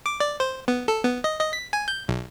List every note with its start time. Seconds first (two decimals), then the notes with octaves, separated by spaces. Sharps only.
0.06 D6
0.20 D5
0.40 C5
0.68 B3
0.88 A4
1.05 B3
1.24 D#5
1.40 D#5
1.53 B6
1.73 G#5
1.88 G6
2.08 B1